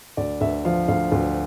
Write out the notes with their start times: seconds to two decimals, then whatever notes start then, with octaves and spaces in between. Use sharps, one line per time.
0.17 D2 D5
0.41 D2 E5
0.65 F3 F5
0.88 D2 F5
1.12 D2